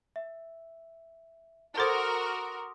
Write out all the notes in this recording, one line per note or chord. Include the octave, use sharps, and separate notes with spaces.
E5
F#4 A4 A#4 C5 C6 D6 D#6